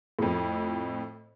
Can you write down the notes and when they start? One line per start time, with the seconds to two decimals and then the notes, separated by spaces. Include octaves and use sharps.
0.19 F2 A2